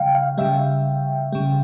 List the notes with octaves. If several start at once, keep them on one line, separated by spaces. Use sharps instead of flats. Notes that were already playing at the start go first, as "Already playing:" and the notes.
Already playing: C#3 G3 F5 G5
F5
C#3 G3 E5
C#3 G3